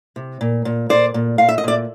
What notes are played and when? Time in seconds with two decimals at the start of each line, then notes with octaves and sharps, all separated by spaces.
0.16 C3
0.41 A#2
0.65 A#2
0.89 A#2 C5 D5
1.14 A#2
1.38 A#2 F5
1.49 E5
1.58 D#5
1.64 A#2 D5 E5